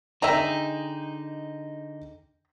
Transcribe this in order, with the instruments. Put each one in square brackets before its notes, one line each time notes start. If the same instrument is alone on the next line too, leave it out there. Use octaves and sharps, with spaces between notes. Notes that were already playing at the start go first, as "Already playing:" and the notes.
[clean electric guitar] D3 D#4 G#4 [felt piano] D#5 G5 [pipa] E5 A#5